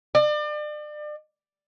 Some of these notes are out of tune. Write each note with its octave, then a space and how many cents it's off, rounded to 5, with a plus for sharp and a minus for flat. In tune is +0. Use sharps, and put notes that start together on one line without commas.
D5 +35